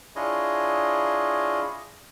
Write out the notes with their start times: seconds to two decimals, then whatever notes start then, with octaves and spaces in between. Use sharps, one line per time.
0.16 D4 E4 F4 G#4 C#5 D#5